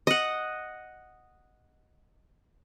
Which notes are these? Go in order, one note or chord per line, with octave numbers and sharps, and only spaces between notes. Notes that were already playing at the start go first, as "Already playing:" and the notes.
D#5 F#5